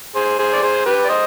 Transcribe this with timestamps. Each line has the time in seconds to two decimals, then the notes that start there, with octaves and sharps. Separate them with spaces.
0.15 G#4 C5
0.39 G#4 C5
0.53 D5
0.62 G#4 C5
0.86 G4 B4
1.04 D5
1.09 C5 D#5